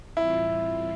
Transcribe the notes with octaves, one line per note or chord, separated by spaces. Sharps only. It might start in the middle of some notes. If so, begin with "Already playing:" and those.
A2 E3 G3 C4 E4 F4